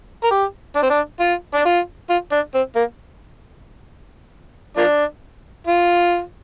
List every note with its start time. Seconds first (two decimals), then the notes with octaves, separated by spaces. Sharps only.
0.24 A#4
0.31 G4
0.76 D4
0.83 C4
0.90 D4
1.19 F4
1.54 D4
1.65 F4
2.10 F4
2.32 D4
2.54 C4
2.76 A#3
4.77 F3 A#3 D4
5.67 F4